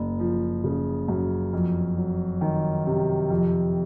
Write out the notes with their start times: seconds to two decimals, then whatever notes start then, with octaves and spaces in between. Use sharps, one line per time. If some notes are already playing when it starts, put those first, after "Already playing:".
Already playing: F#1
0.19 F3
0.64 C#3
1.08 F#2
1.53 F2
1.97 F#3
2.41 D#3
2.87 C3
3.30 F2